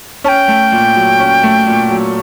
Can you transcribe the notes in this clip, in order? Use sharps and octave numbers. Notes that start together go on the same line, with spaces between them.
C#4 G5 A5
A3
A#2
F#3
C#4
A3
A#2
F#3